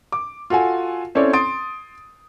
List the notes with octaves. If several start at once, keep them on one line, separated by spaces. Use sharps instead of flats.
D6
F4 F#4 A4 F#5 G#5
C4 C#4 E4 A4 C#5 D5
C6 D#6 A6 D7